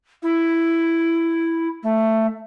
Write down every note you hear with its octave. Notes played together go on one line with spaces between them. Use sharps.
E4
A3